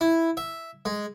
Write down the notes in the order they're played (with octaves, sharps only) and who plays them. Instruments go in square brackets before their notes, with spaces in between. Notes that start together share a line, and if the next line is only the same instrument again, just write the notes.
[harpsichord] E4
E5
G#3